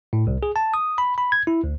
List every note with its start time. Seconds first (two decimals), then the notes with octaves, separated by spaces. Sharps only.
0.13 A2
0.27 C2
0.43 G#4
0.56 A5
0.74 D#6
0.98 B5
1.18 B5
1.32 G#6
1.47 E4
1.64 D2